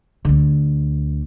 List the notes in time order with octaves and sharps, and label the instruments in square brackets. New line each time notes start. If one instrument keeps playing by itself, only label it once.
[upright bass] D2 D3